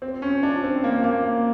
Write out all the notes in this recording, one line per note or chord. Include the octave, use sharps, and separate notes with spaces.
C4
C#4
D4
C4
A#3
A#3